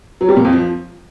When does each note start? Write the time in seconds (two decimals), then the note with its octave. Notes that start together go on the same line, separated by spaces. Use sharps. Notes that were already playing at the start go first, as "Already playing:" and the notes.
0.21 F#3
0.29 G3
0.37 A#2
0.45 F2
0.53 F3